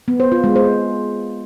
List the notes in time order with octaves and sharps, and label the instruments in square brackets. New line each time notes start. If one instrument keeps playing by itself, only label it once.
[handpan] B3
C5
F4
G#3
C5